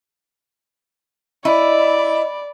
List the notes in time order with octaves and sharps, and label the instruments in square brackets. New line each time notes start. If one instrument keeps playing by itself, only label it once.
[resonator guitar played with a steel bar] E4 [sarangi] D5 [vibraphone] D#5